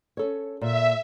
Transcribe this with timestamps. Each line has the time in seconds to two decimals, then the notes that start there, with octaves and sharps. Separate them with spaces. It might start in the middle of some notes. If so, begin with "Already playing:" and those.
0.17 C#4 A4 C#5
0.61 A#2 E5